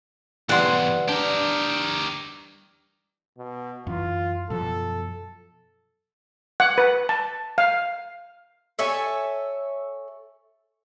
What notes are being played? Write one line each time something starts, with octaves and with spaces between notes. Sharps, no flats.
B1 E2 E3 G3 F#5 C6
D4 G4 A#4
B2
F#2 E3 F4
F#2 B2 F3 A4
F#5
B4
A5
F5
A4 C#5 E5 G#5